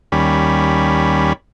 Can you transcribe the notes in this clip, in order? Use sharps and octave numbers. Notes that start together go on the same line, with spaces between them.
D#2 G3 C#4 B5